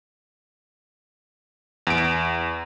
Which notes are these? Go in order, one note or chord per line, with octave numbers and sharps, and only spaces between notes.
E2 D7